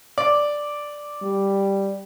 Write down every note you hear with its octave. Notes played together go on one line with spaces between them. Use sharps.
D5
G3